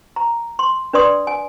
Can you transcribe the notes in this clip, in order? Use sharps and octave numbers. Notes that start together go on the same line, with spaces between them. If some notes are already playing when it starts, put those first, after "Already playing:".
A#5
C6
D4 B4 D5 C6 D#6
G#5